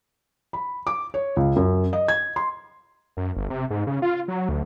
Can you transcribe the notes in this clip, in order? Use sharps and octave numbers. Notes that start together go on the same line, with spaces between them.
B5
D6
C#5
C#2
F#2
D#5
G#6
C6
F#2
G1
C3
G#2
C#3
F4
F#3
D2